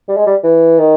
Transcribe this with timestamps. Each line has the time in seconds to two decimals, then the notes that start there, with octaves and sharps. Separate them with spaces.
0.08 G3
0.17 G#3
0.26 G3
0.43 E3
0.79 D#3